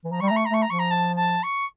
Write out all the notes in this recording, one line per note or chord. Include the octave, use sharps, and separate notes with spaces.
E3
F3 A#5
G3 C#6
A#5
A3
C#6
A#5
A3 C#6
A#5
F3 C#6
A#5
A5
A5
C#6